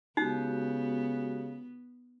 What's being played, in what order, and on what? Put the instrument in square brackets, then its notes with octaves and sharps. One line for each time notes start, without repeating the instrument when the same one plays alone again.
[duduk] C#3 [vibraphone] G#3 F#4 G4 [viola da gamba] B3 [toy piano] D#4